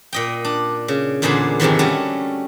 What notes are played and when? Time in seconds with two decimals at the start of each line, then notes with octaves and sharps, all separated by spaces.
0.13 A#2 D#5 G5
0.44 D4
0.88 C#3
1.22 E2 A#2 D3 G#4 C5 B5
1.60 F2 G#2 C3 D#3 E3
1.79 G3 A3 C#4 F#4